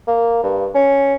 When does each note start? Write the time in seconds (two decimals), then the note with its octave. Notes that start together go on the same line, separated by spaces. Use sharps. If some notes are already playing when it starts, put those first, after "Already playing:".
0.07 A#3
0.43 G2
0.74 C#4